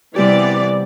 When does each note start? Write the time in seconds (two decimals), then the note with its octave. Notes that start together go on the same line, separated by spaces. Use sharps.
0.16 C3 E3 G3 B3 G4 D5